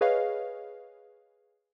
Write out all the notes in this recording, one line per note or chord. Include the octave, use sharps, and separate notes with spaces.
G#4 B4 C#5 D#5 F5